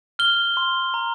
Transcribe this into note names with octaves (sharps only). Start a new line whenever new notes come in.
F6 G7
C6
A#5